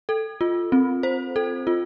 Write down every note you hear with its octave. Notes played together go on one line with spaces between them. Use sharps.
A4
F4
C4
C5
A4
F4